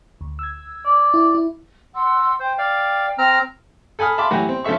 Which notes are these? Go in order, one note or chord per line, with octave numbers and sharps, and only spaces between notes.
D2
E6 G#6
D5
E4
E4
F#5 C6 E6
C5 G5
D5 F5
C4 A#5 F6
A4 G#5 B5 D#6 F6
E5 F5 A5 B5 C6 D6
A2 E3 F#3 F#4 G4
C4
F3 C#4 A4 E5 C#6